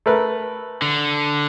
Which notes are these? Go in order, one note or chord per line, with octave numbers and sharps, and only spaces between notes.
A3 A#4 B4
D3